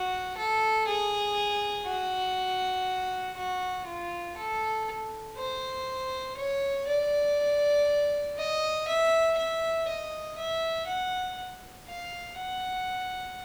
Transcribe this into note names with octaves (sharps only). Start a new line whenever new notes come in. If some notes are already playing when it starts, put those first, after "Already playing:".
Already playing: F#4
A4
G#4
F#4
F#4
F4
A4
C5
C#5
D5
D#5
E5
E5
D#5
E5
F#5
F5
F#5